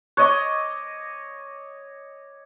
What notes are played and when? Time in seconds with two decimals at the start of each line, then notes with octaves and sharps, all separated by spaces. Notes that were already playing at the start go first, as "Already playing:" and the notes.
0.17 C#5 D#5 C#6 D6 F#6